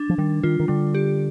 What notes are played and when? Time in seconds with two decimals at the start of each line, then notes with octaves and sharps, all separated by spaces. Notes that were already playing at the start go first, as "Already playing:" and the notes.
Already playing: D4
0.09 F3
0.18 D#3 G3
0.43 D#3 F4
0.59 D#3
0.68 D3 G3
0.95 G4